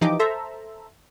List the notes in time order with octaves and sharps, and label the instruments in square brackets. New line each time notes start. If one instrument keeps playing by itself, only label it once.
[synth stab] E3 F3 D#4 G4 D#5 D6
A4 C5 E5 A#5